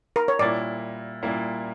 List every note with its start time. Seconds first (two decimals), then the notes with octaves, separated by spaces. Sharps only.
0.16 A#4
0.28 C#5
0.39 A#2 G3 A#3 E4 D5
1.23 A#2 G3 A#3 E4